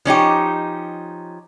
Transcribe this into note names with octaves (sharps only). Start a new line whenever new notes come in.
F3 C#4 D#4 G4